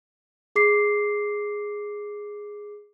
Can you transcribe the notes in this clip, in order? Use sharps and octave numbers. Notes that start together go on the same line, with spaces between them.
G#4 D6 C7